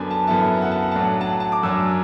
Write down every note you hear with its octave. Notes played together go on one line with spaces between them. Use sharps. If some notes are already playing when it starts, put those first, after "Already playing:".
Already playing: F#2 D3 B3 D4
A5
F#2 D3 B3 E4 A5
F#5
A5
F#5
A2 F#3 D4 A5
F#5
A5
F#5
A5
D6
F#2 F#3 D4 E6